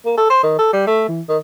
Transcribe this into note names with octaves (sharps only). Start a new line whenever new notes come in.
A#3
A4
C5
D#3
A4
G3
A3
E3
D#3